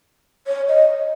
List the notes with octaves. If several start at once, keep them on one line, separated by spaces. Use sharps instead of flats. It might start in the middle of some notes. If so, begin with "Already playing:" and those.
C#5
D#5